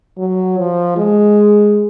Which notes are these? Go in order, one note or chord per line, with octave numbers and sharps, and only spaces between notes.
F#3
F3
G#3